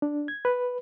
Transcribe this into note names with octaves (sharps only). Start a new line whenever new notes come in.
D4
G#6
B4